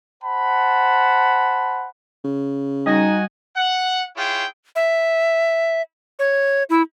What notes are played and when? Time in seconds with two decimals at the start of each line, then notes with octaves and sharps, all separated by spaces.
0.24 C5 F#5 A5 B5
2.24 C#3
2.86 G3 D#4 F#4 D#5 G#5 A#6
3.56 F#5
4.16 E4 F4 G#4 C#5 G5
4.76 E5
6.19 C#5
6.70 E4